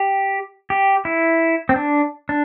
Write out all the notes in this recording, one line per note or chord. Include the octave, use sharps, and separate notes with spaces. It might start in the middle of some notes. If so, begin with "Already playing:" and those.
Already playing: G4
G4
E4
C4
D4
D4